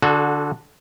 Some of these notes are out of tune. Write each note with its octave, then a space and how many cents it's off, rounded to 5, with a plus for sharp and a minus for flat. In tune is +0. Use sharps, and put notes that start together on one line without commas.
D3 +0 F#4 -20 A4 -40